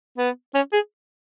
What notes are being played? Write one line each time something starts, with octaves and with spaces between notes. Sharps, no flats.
B3
C#4
G#4